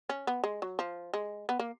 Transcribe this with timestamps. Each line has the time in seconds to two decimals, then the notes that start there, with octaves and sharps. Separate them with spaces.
0.09 C#4
0.27 B3
0.44 G#3
0.62 F#3
0.79 F3
1.14 G#3
1.49 B3
1.59 A#3